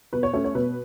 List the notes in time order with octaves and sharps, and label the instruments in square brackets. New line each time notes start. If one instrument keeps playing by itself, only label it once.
[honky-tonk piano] B2 B4
C#5
A3 C#4 C#5
C#5
B2 B4